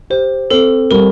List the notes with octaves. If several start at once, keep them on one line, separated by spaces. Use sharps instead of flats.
G4 C5
C4 A4
G3 A#4